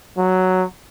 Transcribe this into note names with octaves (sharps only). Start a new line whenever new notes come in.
F#3